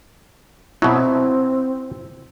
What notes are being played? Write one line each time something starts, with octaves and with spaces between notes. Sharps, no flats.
B2 F#3 C4 E4